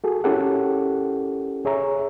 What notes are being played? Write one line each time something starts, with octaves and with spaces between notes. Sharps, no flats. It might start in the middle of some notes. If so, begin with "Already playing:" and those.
F#4 G#4 A4
C#4 E4 G4 A4 A#4 F#5
G#4 C#5 E5 A#5